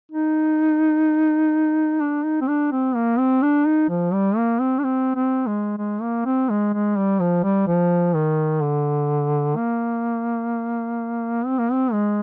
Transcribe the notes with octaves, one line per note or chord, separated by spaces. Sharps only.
D#4
D4
D#4
C4
D4
C4
A#3
C4
D4
D#4
F3
G3
A#3
C4
D4
C4
C4
G#3
G#3
A#3
C4
G#3
G#3
G3
F3
G3
F3
D#3
D3
A#3
C4
A#3
C4
G#3